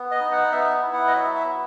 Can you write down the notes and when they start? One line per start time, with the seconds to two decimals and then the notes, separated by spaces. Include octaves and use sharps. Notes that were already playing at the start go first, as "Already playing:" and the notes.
Already playing: B3
0.11 D#5
0.21 D#4
0.32 F#5
0.52 B3 E5
0.82 E4
0.93 F#5
1.08 D#5
1.13 F#3 E5
1.35 E5
1.44 B3